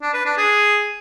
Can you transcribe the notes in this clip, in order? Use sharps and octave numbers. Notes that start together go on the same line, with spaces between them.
D4
B4
D4
G#4